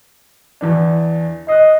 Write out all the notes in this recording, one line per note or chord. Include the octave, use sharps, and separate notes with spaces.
E2 E3 D4
D#5 F#6 C7